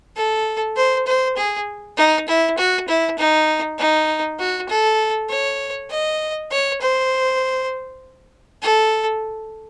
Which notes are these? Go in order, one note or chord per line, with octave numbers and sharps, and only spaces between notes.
A4
C5
C5
G#4
D#4
E4
F#4
E4
D#4
D#4
F#4
A4
C#5
D#5
C#5
C5
A4